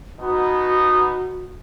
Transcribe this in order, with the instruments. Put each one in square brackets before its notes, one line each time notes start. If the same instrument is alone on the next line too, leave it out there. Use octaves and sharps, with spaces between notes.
[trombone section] B2 B3 D#4 [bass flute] F#4